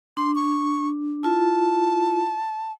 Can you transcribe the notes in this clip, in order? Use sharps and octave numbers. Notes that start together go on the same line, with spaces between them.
D4 C6
C#6
E4 F4 A5